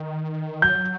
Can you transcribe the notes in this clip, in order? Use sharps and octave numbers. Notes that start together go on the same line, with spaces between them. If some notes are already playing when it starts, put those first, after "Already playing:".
Already playing: D#3
F#3 G6